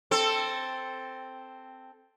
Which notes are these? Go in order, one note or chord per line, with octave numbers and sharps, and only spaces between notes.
C4 A4